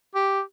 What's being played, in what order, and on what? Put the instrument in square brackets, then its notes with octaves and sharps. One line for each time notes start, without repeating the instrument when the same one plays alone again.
[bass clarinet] G4